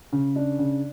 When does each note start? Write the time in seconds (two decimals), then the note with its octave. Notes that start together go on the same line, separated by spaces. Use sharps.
0.12 C#3
0.36 D4
0.59 C#3